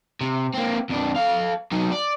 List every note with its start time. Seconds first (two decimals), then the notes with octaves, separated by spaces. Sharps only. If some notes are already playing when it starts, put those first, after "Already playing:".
0.21 C3
0.54 A#3 C4
0.89 F2 D4
1.16 A4 F5
1.72 F#3 D#4
1.92 D5